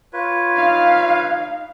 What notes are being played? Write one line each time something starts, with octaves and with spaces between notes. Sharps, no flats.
F4 B4 C#5
D#4 F5